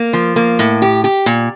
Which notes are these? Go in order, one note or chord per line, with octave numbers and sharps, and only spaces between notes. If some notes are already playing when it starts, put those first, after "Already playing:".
Already playing: A#3
F3
A#3
A2
G4
G4
A#2